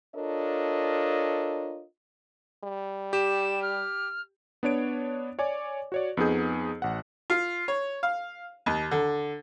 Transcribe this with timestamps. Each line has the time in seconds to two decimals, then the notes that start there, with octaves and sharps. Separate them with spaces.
0.15 D4 F4 A4 A#4 C#5 D#5
2.64 G3
3.13 G4 E7
3.62 F6
4.63 B3 D4 C#5 D7
5.39 C#5 D5 G#5 D6
5.92 F#4 C#5 D5
6.17 F2 B3 D#4 G#4 G6
6.82 A1 F#5
7.30 F4
7.68 C#5
8.03 F5
8.66 D#2
8.91 D3